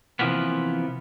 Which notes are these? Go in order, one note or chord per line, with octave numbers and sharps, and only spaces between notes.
C3 E3 F3 A#3 B3